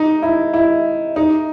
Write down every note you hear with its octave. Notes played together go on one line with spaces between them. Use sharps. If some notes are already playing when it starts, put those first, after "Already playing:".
Already playing: D#4
E4
E4
D#4